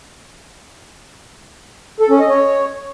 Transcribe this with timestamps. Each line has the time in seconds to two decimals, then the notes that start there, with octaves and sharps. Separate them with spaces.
2.00 A4
2.10 C#4
2.20 D#5
2.29 C#5